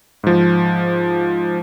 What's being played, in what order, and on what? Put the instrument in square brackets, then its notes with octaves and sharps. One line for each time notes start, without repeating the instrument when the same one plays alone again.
[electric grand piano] G#2 F3